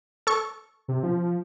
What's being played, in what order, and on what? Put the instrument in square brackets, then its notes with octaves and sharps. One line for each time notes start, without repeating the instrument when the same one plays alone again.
[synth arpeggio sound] A4 C#6
[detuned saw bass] C3
F3